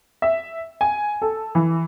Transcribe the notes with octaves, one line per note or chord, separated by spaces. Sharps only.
E5
G#5
A4
E3